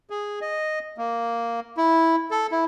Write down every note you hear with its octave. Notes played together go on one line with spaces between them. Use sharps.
G#4
D#5
A#3
E4
A4
E4